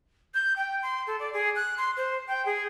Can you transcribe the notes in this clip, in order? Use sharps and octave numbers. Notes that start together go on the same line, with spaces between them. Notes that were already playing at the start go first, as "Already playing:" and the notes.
G6
G5
C6
A4
D5
G#4
F#6
C6
C5
G5
G#4